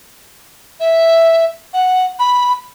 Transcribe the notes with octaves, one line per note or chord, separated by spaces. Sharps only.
E5
F#5
B5